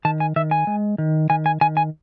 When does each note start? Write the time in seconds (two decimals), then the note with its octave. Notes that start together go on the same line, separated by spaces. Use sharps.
0.05 D#3 A5
0.20 G#5
0.36 D#3 E5
0.51 G#5
0.67 G#3
0.98 D#3
1.30 D#3 G#5
1.46 G#5
1.61 D#3 G#5
1.77 G#5